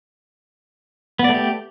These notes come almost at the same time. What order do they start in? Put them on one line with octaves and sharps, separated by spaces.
B3 D5 A3 G4